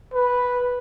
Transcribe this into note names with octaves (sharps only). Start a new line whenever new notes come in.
B4